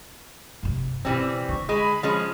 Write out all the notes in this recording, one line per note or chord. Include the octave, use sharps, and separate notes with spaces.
G2 C3
B2 E3 G3 C4
D3 C#6
G#3 B5
F3 G#3 C#4